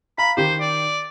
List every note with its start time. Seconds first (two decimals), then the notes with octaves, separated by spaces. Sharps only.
0.18 F5 A#5 B5
0.37 D#3 G4 C5
0.60 D5